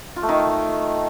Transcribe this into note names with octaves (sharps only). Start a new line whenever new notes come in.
F4
A3
D#3